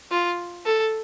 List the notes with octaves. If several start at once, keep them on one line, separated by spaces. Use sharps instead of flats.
F4
A4